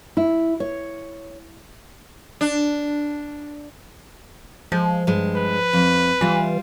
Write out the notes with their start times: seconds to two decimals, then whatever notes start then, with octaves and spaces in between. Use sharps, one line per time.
0.17 E4
0.60 C#5
2.41 D4
4.72 F3 G#3
5.07 G2 G#3
5.37 B4
5.73 F2
6.21 E3 G3 F4